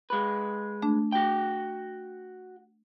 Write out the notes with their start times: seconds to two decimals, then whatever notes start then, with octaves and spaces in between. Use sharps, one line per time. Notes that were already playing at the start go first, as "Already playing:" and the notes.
0.10 G#3 B4
0.82 A3 D4
1.12 F#4 G5